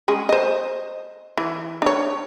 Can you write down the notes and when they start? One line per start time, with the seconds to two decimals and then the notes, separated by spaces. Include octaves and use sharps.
0.08 G#3 C#4 G#4
0.29 C5 D#5
1.37 E3
1.82 D4 C#5